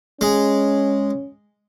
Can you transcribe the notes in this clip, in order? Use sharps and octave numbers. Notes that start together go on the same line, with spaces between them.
G#3 C#4